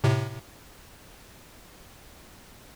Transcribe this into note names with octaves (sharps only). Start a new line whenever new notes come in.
A2 C3